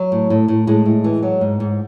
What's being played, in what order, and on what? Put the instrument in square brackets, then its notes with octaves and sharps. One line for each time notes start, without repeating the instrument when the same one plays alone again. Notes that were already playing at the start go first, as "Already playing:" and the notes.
Already playing: [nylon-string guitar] F#3
A2
A2
A2
A2 G#3
A2
E3
F#3
G#2
G#2